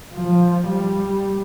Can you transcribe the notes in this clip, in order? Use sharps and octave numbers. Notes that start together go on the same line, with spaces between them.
F3
G3